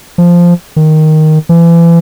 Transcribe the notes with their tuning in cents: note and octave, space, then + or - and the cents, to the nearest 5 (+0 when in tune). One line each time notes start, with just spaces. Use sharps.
F3 -5
D#3 +0
E3 +35